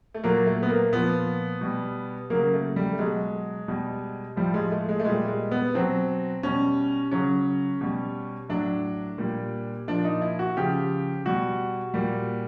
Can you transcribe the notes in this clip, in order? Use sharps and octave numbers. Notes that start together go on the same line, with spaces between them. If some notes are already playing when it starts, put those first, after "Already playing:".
A3
A#2 F#3 A#3
A3
B3
A#3
A#2 F3 B3
B2 G3
C#3 F#3 A#3
A3
G3
A3
B2 F#3 G#3
B2 G3
A2 F3 G3
G#3
A3
G#3
A3
A#2 G3 G#3
G#3
B3
B2 F#3 C4
B2 G3 C#4
C#3 F#3 C#4
B2 G3
A2 F#3 D4
A#2 G3
A#2 F3 D4
D#4
E4
F#4
C#3 F3 G4
B2 G3 F#4
A#2 G3